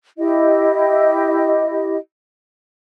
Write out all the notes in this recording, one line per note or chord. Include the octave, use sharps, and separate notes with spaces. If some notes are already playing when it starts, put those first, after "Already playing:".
E4 G4 D#5